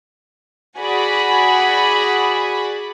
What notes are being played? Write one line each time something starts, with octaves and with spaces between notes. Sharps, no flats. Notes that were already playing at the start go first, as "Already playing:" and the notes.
F#4 G#4 D5 F#5 G#5 B5